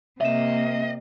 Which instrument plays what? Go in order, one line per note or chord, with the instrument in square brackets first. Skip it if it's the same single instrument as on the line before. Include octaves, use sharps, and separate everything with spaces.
[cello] C3 A#3 [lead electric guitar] D#5 [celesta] E5 E7